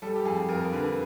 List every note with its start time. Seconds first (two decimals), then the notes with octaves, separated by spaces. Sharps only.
0.02 G3 A4
0.16 G4
0.26 F2 G#4
0.49 F2 A#4
0.73 D3 B4